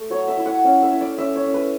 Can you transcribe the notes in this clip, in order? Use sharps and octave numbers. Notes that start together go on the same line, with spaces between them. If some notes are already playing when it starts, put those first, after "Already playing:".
Already playing: A3
F#3 C#5
E5
E4
F#5
C#4
E5
E4
D5
C#4 E5
C#5
C#4
B4